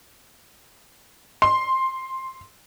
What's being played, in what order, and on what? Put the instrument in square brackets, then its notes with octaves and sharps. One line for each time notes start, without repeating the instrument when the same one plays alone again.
[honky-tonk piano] C6